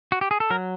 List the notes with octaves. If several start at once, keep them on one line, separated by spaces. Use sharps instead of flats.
F#4
G4
G#4
A4
F#3 A#4